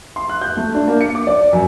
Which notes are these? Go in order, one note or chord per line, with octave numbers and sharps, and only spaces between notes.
C6
F#6
G6
A3
D4
A#3
C#7
D6
D5
F#2